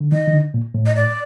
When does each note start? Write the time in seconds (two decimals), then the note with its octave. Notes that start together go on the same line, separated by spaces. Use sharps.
0.01 D3
0.12 D#3 D#5
0.27 D#3
0.33 D3
0.54 A#2
0.75 A2
0.86 D#5
0.96 D5